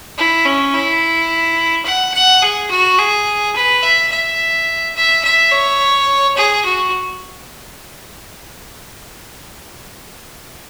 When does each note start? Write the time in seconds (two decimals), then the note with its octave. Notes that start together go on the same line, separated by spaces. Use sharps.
0.18 E4
0.45 C#4
0.74 E4
1.86 F#5
2.14 F#5
2.42 G#4
2.71 F#4
2.99 G#4
3.56 B4
3.83 E5
4.12 E5
4.96 E5
5.24 E5
5.51 C#5
6.37 G#4
6.65 F#4